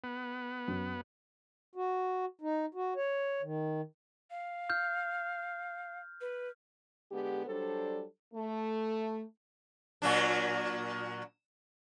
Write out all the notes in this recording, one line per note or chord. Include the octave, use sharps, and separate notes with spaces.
B3
F#2
F#4
D#4
F#4
C#5
D#3
F5
F6 G6
B4
D3 G#3 B3 G4
F#3 G3 D4 A4 C5
A3
A#2 F#3 D4